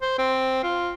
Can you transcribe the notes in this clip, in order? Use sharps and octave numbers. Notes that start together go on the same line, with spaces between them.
C5
C4
F4